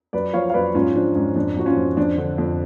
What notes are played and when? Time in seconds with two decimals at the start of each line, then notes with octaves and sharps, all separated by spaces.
0.13 F#2 B4 D5
0.33 F3 C#5 F5
0.50 F5
0.54 F#2 B4 D5
0.74 G#2 C#4 F4
0.95 F3 D4
1.15 G#2 C#4
1.36 F2 D4
1.57 F2 F#4
1.66 C#4 F4
1.77 F3
1.97 F2 D4
2.18 D3
2.38 F2